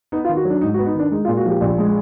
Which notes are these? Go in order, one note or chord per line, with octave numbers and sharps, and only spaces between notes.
B3 D#4
F4
D#3
F#4
F#3
D4
G#2 D#4
F#4
B3
D#4
D#3 D4
G#3 D#4
F4
A#2
F#4
F3 G4
A#1
G#3